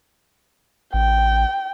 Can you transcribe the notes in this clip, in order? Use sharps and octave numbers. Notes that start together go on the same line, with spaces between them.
A1 G5